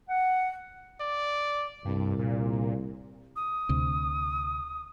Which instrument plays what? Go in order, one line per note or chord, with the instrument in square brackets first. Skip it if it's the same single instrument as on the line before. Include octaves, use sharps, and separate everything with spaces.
[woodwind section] F#5
[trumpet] D5
[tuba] C2 [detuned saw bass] G2
[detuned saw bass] A#2
[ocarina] D#6
[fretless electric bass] D2 C3